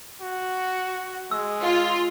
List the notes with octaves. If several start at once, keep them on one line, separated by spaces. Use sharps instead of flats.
F#4
G#3 E6
F4